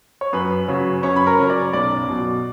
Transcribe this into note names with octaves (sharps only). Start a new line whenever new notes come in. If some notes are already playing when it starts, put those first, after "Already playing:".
C#5
F#2 B4
C#3 F#3 C#4
F#2 C#4 C#5
B5
A#4 A#5
C#3 F#3 C#4
D5 D6
B1 D5 D6
B2 F#3